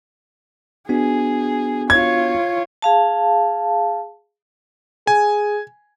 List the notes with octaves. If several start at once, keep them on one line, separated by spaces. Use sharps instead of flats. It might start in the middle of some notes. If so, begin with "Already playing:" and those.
B3 D4 F#4 G#4
F4 C#5 G#6
G#4 F5 A5
G#4 G#5